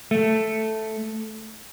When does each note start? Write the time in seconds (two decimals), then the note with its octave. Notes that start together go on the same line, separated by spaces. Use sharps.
0.11 A3